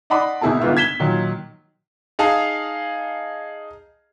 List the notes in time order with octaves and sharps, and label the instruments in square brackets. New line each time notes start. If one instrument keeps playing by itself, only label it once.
[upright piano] D5 D#5 F#5 B5 C6 D6
G#1 B2 E4 G#4 A#4 A5
G1 G#2 G#3 B3 F4 E5
G#6 B6 E7 G7
A#2 D#3 F#3
[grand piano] D#4 G#4 F5 A5